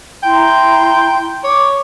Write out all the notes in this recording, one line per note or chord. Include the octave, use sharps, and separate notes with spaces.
E4 G5 A#5 C6
C#5 D6